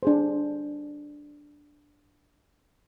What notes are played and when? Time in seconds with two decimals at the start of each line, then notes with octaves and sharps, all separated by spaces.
0.03 D4 G#4 C5